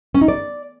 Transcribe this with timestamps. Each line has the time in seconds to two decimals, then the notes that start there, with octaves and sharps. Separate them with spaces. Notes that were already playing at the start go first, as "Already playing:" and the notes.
0.15 C#4
0.21 D#4
0.28 D5